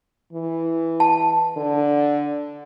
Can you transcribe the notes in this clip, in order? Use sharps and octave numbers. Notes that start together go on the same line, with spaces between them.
E3
A5
D3